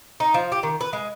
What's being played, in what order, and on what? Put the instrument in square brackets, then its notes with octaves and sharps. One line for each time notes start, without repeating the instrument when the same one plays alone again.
[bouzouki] D#4
F3
G4
D#3
B4
G#3